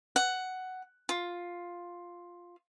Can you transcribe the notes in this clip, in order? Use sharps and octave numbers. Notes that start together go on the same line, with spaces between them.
F#5
F4